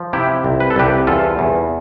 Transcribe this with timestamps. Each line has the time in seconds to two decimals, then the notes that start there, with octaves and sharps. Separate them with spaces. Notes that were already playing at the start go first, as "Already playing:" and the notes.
Already playing: F3
0.13 C3 E4 G4
0.44 C2
0.60 B4
0.70 A4
0.76 C2 G4 B4
1.07 E2 F4 A4
1.39 E2